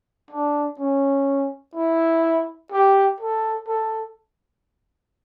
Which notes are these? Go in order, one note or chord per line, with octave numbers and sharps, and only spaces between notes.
D4
C#4
E4
G4
A4
A4